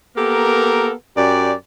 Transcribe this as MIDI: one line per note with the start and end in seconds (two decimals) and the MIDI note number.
0.17 0.92 58
0.17 0.92 59
0.17 0.92 67
0.17 0.92 69
0.17 0.92 70
1.16 1.52 42
1.16 1.52 67
1.16 1.52 74